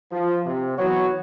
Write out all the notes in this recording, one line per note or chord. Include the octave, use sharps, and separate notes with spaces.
F3
C3
E3 F#3 B3 F#4 C#5